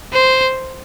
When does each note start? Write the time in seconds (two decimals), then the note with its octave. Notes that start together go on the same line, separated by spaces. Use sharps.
0.13 C5